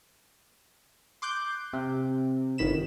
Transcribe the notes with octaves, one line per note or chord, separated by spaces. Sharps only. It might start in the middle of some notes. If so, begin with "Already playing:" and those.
C6 D6 F#6 G6
C3
G1 D#3 B5 E7